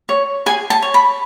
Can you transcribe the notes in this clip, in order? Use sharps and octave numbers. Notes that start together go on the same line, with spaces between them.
C#5
G#4 G#5
A5
C#5
B5